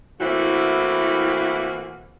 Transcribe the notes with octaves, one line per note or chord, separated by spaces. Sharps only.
E3 A3 A#3 C4 E4 F#4